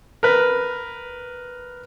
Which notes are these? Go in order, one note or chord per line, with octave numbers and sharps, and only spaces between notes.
A#4 B4